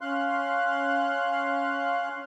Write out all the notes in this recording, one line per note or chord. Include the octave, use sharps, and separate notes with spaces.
C#4 F5 C6 F#6